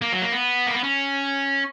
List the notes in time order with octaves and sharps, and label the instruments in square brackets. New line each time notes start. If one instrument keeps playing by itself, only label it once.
[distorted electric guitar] A#3
F#3
A#3
B3
A#3
B3
C#4